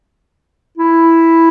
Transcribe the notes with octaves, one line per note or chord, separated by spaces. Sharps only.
E4